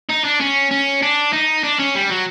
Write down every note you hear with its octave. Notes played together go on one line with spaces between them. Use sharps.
D#4
D4
C#4
C#4
D4
D#4
D4
C#4
G3
F#3